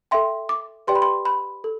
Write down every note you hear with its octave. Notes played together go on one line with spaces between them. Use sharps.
A4 E5 G5 C6
D6
G4 B4 D5 G5 C6
B5
C6
B5
A4